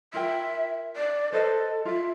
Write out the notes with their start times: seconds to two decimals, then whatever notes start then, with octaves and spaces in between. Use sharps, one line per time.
0.14 F4 A#4 E5 G5
0.96 D5
1.32 A4 B4 C5 D#5
1.85 F4 E5